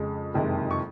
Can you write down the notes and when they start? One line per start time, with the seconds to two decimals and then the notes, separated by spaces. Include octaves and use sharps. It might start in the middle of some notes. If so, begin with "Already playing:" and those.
Already playing: F2 C#3 G#3
0.34 F#1 F2 C3 D#3 G#3
0.71 C#6